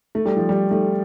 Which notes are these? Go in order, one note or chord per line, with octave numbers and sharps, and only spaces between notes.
A3
G3
F3
G3
A3